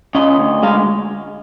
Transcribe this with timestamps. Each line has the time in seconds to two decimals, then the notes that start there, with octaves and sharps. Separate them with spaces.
0.15 C#3 D#5
0.39 D2
0.63 G#3 F5